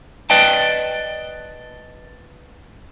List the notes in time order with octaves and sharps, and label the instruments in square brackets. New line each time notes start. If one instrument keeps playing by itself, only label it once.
[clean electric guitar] B4 D5 D#5 G5 A5